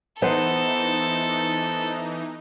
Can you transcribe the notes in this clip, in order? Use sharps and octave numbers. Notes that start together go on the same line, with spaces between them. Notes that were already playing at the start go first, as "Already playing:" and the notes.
E3 B3 D#4 A4 C5